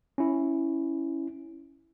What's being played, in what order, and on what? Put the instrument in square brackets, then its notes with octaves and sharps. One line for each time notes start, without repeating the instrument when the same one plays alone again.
[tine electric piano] C#4 E4